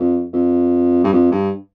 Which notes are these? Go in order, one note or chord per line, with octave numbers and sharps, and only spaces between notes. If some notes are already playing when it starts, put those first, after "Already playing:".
Already playing: F2
F2
G2
F2
G2